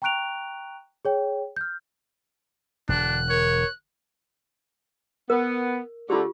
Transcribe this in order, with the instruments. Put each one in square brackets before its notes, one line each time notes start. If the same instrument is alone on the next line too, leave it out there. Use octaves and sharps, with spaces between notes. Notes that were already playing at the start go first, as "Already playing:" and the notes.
[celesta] G5 A#5 C#6 F#6 D7 F7
G#4 C#5 G5
F6 G6
[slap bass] E1 D3 [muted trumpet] D4 [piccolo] F#6
[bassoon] A#4 [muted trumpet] C#5
[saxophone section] B3 [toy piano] A#4
[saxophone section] D3 A3 [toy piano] F4 G4